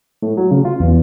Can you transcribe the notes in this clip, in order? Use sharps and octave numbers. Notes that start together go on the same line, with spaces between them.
A2
F#3
C#3
F4
E2